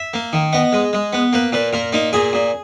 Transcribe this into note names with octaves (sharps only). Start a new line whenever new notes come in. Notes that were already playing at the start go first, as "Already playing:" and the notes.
Already playing: E5
A#3
D#3
B3 D#5
G#3
G#3
B3
A#3 B4
A#2 B4
A#2 A#4
A#3 D#4
A#2 G#4
A#2